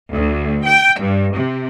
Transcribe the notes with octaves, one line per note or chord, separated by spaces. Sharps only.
D2
G5
G2
C3